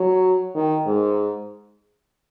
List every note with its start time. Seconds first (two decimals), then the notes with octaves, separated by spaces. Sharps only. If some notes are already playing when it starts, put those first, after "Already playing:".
Already playing: F#3
0.54 D#3
0.86 G#2